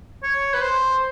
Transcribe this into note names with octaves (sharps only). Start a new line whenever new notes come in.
C#5
B4
C5